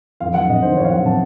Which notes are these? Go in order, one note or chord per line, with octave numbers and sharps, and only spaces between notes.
F2 F5
F#3 F#5
C3 D#5
D#3 C5
F2 C#5
F5
F#3 F#5
C3 A5